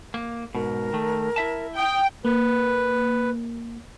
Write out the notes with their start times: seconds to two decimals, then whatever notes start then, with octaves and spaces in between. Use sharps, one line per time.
0.14 A#3
0.55 G#2 B2 A#4
0.93 D#3 A3
1.36 E4 E5 A5
1.76 G5 D#6
2.25 A#3 B4